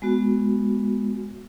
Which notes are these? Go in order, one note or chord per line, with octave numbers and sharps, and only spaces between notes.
G#3 B3 F#4